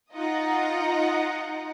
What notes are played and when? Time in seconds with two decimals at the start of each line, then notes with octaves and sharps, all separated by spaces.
0.12 D#4 F4 D#5 F#5 A#5